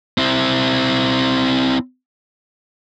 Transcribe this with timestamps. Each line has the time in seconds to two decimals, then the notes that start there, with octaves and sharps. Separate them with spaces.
0.18 C4 E4